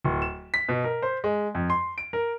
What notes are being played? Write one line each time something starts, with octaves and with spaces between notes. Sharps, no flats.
D1
E7
B6
B2
A#4
C5
G#3
F2
C6
D7
A#4